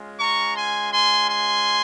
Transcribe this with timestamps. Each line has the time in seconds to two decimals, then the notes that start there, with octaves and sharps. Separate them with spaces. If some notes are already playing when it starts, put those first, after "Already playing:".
Already playing: G#3 C#4 F4
0.19 A#5 C#6
0.56 G#5 C6
0.92 G#5 C6
1.29 G#5 C6